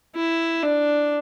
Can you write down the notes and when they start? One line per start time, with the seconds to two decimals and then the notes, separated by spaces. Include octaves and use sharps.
0.16 E4
0.63 D4